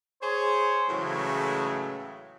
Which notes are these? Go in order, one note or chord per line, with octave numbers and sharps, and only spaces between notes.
G#4 C5 C#5
A2 C#3 E3 F#3 G#3 A3